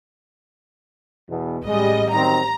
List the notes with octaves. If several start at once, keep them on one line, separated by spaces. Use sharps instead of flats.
E2 B2
A1 G3 G#3 D#5
D#3 F#3 C4 A#5